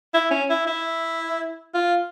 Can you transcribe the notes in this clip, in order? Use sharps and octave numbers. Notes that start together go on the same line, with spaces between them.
E4
C#4
E4
E4
F4